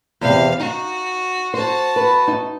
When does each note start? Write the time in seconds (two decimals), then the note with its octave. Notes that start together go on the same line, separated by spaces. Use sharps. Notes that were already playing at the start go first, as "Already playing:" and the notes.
0.21 E2 C3 F5
0.60 D#4 F#4
1.54 F#4 C5 A5
1.96 B4
2.28 D#4